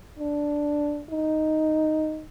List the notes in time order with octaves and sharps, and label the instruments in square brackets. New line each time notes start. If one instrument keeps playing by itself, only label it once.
[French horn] D4
D#4